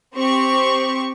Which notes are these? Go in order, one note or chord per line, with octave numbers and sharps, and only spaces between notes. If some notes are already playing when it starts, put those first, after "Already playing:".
C4 G4 C#6